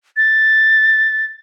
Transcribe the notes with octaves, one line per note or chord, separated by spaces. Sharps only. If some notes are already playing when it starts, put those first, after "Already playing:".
A6